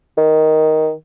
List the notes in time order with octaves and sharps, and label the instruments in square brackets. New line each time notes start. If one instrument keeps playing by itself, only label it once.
[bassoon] D#3